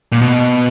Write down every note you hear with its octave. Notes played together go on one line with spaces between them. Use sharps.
A#2
B2